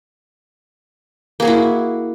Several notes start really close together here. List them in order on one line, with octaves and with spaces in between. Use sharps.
A#3 G#4 F#4 E4